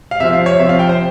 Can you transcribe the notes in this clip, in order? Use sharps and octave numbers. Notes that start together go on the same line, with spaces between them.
F5
C3 F3 C4 E5
F5
C#5
C3 F3 C4 E5
F5
G5
C5